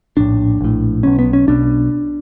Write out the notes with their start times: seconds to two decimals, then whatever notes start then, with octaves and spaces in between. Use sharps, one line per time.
0.17 A#1 A2 D4
0.61 A#1 A2
1.03 B1 B2 C#4
1.19 B3
1.33 C#4
1.47 B1 B2 D4